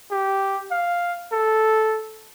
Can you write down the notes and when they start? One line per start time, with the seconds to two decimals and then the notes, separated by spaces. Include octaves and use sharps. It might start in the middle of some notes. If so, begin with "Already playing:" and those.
0.11 G4
0.71 F5
1.33 A4